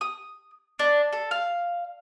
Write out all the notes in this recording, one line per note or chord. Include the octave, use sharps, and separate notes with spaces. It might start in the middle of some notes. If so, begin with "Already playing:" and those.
D#6
D4
A4
F5